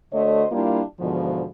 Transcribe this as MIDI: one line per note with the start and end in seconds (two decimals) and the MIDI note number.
0.13 0.44 50
0.13 0.44 57
0.13 0.44 66
0.13 0.44 72
0.13 0.44 73
0.13 0.44 75
0.52 0.80 55
0.52 0.80 58
0.52 0.80 62
0.52 0.80 64
0.52 0.80 65
0.99 1.44 40
0.99 1.44 44
0.99 1.44 47
0.99 1.44 50
0.99 1.44 53